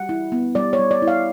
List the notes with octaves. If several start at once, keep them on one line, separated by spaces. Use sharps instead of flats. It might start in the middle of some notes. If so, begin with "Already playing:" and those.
Already playing: G3 F#5
E4
B3
G3 D5
C#5
G3
D5
E4
F5